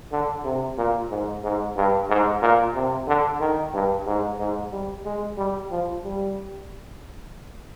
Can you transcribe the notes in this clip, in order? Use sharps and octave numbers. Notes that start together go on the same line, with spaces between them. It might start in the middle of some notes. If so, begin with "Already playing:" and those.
D3
C3
A#2
G#2
G#2
G2
G#2
A#2
C3
D3
D#3
G2
G#2
G#2
G3
G#3
G3
F3
G3